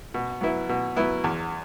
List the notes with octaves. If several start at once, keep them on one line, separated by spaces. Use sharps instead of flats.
B2
F#3 B3 E4
B2
F#3 B3 E4
E2